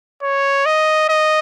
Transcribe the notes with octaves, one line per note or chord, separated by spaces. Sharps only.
C#5
D#5
D#5